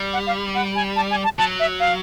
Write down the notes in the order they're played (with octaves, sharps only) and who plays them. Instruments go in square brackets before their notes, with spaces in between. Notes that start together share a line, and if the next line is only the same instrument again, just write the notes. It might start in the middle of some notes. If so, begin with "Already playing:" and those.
Already playing: [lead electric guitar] G3
[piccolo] F#5
F5
F#5
G#5
A5
G#5
A5
[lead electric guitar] F#3 [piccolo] A5
[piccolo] E5
F5